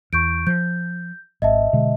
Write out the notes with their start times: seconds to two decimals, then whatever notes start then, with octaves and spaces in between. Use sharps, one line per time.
0.13 E2 C#6 G6 D7
0.47 F3 G6
1.42 G#1 D#5 E5 A5
1.73 B2 D3 G#3